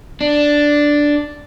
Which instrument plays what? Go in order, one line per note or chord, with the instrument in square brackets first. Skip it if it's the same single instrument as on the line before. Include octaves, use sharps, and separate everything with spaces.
[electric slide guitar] D4